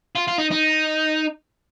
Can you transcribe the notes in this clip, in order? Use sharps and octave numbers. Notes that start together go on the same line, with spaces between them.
F4
F4
D#4
D#4